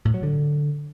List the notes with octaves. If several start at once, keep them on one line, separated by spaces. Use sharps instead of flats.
A2
F#3
D3